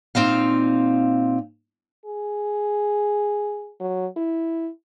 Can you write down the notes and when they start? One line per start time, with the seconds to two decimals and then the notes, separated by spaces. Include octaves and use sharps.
0.15 A#2 C4 D#4 F5
2.06 G#4
3.80 F#3
4.17 E4